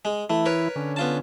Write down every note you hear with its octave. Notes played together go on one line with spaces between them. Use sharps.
G#3
E3 A3 E4
A#4 B4 C#5
D3 C#4
B3 F4 A5